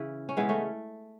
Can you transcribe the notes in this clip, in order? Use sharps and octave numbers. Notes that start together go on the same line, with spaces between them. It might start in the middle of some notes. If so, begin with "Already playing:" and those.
Already playing: C#3 E3 C#4
C#4
C#3 E3 G#3 B3
A3 C#4